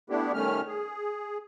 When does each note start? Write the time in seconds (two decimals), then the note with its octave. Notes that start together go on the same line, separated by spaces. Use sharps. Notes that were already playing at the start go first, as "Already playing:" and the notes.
0.10 A3 B3 D4 E4 G4
0.34 D#3 G3 A3 C#4 F6
0.67 G#4